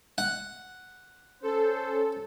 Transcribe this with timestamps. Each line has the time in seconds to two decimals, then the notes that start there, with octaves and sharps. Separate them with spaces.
0.18 F#5
1.43 C#4 A4 C5